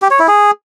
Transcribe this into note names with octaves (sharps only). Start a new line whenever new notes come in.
G4
C#5
E4
G#4